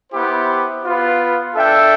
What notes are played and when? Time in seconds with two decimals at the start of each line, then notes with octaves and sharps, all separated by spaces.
0.12 B3 E4 G4 C5
0.83 B3 F4 B4
1.54 D4 A4 E5 G5